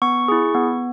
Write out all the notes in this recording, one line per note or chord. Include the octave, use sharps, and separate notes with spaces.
B3 C#6
E4 G#4
B3